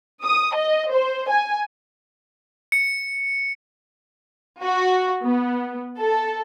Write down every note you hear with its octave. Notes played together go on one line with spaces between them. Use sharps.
D#6
D#5
C5
G#5
C#7
F#4
B3
A4